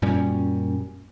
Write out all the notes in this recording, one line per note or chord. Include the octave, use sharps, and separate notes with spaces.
F#2 A#2 G3 C#4